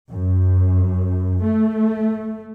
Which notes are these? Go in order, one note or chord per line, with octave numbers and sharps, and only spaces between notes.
F#2
A3